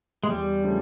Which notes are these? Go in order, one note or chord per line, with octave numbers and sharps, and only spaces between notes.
G#3
E2 G3
C#3 F3 A3 D4